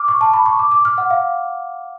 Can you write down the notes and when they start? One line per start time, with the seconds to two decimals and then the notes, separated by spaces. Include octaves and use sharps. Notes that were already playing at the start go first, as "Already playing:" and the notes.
Already playing: D6 F6
0.08 C#6
0.21 A5
0.34 B5
0.46 C#6
0.59 D6
0.71 D6
0.85 F6
0.98 F#5
1.10 F5